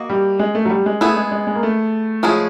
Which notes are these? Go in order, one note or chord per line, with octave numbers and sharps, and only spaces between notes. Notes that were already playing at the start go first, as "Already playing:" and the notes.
Already playing: A#3 F#4 D#5
G3
G#3
A3
F#3
G3
G#3
A3 B3 E4 G#4
G#3
G#3
G#3
A#3
A3
F3 G#3 C#4 E4 G#4